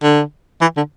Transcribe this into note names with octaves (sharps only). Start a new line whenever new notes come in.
D3
E3
D3